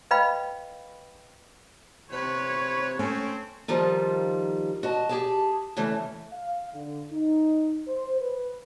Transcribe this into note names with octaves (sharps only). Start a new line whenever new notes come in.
B4 D#5 F5 G5 B5
C3 B4 C#5
A3 C4 C#4
D#3 F3 G3 D#4 F4
F#4 D#5 A5
G4 G#4 A5
C#3 E3 A3
F5
D3
D#4
C5
B4